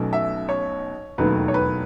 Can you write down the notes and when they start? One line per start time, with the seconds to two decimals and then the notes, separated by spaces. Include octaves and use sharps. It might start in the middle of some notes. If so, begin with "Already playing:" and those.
Already playing: B1 B2 F#3 A3 C#4
0.13 E5
0.49 C#5
1.18 E1 D#2 D#3 F#3 A3 B4
1.48 C#5
1.54 B4